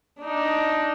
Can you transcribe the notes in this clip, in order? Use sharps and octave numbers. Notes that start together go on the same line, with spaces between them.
D4 D#4